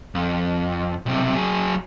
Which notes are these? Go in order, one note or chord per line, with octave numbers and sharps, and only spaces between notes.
F2
B1 C3
F#3 G#4